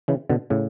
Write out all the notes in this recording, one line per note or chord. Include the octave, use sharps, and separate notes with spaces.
C#3 E3
B2 D3
A2 C#3